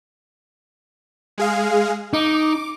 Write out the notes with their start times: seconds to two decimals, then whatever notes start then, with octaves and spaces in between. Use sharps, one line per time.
1.38 G#3 G#4 F5
2.13 D#4 D6